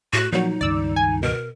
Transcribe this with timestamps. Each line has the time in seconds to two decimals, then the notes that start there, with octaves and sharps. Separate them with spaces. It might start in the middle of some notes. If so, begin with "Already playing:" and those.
0.13 A2 F#4 F#6
0.32 A#2 F3 F#3 D#4
0.61 C#2 G2 D#3 D5 E6
0.96 G#5
1.23 B2 A#4